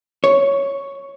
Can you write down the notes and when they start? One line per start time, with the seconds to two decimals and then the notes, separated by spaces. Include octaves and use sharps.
0.24 C#5